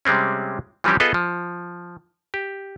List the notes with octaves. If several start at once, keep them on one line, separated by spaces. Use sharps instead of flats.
C3 G3 G#3 C4 C#4
E3 F3 G3 C4 C#4 G4
B3 F4 G#4 A4 B4 D#5
F3
G4